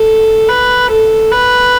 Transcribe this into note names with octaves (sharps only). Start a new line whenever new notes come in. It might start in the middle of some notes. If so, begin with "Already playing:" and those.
Already playing: A4
B4
A4
B4